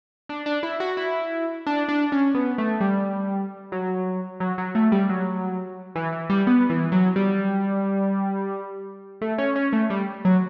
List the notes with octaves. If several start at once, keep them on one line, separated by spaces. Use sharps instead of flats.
D4
D4
E4
F#4
E4
D4
D4
C#4
B3
A3
G3
F#3
F#3
F#3
A3
G3
F#3
E3
E3
G3
B3
E3
F#3
G3
A3
C#4
C#4
A3
G3
F#3